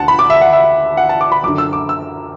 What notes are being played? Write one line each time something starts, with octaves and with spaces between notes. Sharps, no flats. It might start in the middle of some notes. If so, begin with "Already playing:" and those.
Already playing: D2 D3 F#5 A5
B5
D6
E5
F#5
E5
F#5
A5
D6
B5
F#2 D3 D6
E6
D6
E6